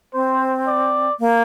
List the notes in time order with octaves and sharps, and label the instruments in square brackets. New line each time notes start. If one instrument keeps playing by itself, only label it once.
[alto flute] C4 [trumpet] C5
[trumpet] D5
[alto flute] A#3